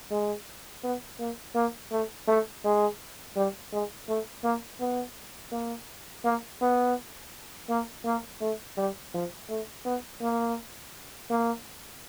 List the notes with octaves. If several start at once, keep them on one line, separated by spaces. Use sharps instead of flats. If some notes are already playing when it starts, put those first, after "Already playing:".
G#3
B3
A#3
A#3
A3
A3
G#3
G3
G#3
A3
A#3
B3
A#3
A#3
B3
A#3
A#3
A3
G3
F3
A3
B3
A#3
A#3